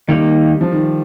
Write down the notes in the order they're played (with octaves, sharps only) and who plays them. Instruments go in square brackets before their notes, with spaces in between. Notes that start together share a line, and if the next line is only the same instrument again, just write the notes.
[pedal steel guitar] D#3 A#3 D#4 [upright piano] G3
[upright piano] F3
D#3